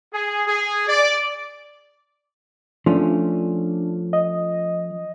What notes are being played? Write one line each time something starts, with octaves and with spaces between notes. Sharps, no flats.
G#4
G#4
D5
F3 A3 C#4 D4
D#5